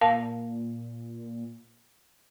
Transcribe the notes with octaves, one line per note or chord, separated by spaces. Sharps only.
A#2 A#4 F5 A5